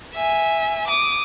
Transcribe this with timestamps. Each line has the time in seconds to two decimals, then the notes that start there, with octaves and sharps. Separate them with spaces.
0.15 E5 G#5
0.88 D6 D#6